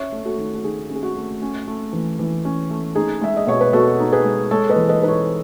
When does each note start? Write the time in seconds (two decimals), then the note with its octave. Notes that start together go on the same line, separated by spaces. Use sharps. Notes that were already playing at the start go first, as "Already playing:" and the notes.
Already playing: C#4 C#5 E5
0.12 A3
0.25 F#4 A4
0.38 D#3
0.55 F#4
0.63 D#3 G#4
0.90 C#4
0.95 G#4
1.03 F#4
1.16 A3
1.42 C#4
1.67 A3
1.93 E3
2.19 E3
2.45 C#4
2.70 A3
2.95 D#4 G#4
3.21 G#3 E5
3.37 D#5
3.47 B2 C#5
3.61 B4
3.73 B2 F#4 A4
3.99 D#4
4.12 G#4 B4
4.24 G#3
4.51 G#3 A4 C#5
4.70 B4 D#5
4.76 E3
4.89 B4 D#5
5.02 D#4 B4
5.08 A4 C#5